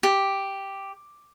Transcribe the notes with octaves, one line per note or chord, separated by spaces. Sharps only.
G4